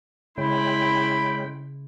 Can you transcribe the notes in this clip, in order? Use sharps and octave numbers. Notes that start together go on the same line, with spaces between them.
C#3 G#3 C#4 E4 G5 B5 C6